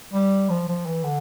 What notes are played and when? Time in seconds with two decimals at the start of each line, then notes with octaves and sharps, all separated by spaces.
0.13 G3
0.50 F3
0.68 F3
0.86 E3
1.04 D3